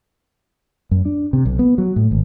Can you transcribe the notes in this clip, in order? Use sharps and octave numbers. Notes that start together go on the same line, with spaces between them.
F#2
D4
C3
B1
B3
F#3
A2
G#1